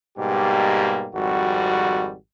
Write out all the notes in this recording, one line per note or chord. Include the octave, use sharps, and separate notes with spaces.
G#2 B2 G3 A#3 G4
G#1 F2 G3 F#4